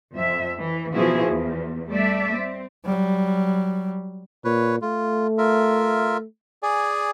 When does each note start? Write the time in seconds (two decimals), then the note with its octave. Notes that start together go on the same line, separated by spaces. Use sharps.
0.13 F2 E5
0.58 E3
0.93 B2 E3 F3 E4 F#4 G#4
1.27 E2
1.89 G3 A3 D5 E5
2.34 C4
2.85 F#3 G3
4.45 A#2 B4 C#5
4.82 A3 F4
5.38 F4 A#4 E5
6.63 G#4 D5 G#5